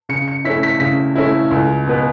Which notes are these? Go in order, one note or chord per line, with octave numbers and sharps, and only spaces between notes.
C#3 C#7
C#7
A3 C#4 E4 B6
B6
C#3 B6
A3 C#4 E4
C#2
B2 B3